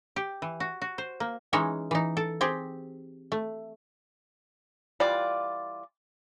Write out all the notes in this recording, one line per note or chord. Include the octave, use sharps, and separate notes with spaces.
G4
E3
F#4
F#4
C5
A#3
E3 G#3 C#4 D#4 C#5 E5
E3 D#4
A4
C4 G4 G#4
A3
E3 G3 F4 D5